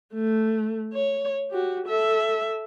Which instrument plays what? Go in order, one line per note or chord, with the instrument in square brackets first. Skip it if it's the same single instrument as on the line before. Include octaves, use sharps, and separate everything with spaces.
[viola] A3
C#5
F#4 G4
A4 E5